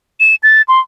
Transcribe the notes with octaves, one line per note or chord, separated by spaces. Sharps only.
E7
A6
C6